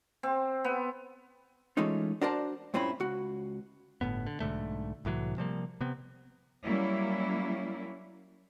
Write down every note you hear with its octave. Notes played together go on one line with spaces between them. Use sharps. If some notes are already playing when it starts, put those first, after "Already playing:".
C4
B3
E3 G#3 A3 C#4 D#4 F4
D4 F#4 A#4 C5 D5 A5
G2 A#2 C4 C#4 E4 B5
C#2 F#4
G1 A2 B3
D3
B1 G#2 D3 A3
C2 A2 E3 F#3
C3 F3 G3 A#3
C3 B3 C4
F#3 G3 A#3 C#4 E4